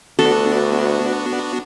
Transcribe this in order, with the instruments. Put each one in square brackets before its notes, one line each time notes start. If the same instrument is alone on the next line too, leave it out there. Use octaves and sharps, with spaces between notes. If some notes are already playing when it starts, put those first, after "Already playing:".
[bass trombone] D2 [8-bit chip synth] B3 D4 F#4 [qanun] A4